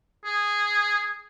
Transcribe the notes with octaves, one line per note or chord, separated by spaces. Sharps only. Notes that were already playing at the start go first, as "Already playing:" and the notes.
G#4